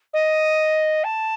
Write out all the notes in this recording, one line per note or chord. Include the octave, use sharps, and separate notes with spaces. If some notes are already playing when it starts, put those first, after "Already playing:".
D#5
A5